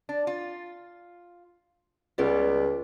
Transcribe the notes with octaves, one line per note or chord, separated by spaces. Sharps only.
D4
F4
C#2 C#3 G3 B3